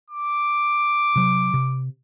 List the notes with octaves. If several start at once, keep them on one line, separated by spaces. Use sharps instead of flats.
D6
C3 F#3
C3